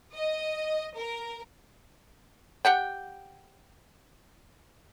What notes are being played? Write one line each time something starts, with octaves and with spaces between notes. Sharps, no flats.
D#5
A#4
G4 F#5 G5